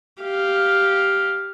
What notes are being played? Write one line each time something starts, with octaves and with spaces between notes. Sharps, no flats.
G4 F5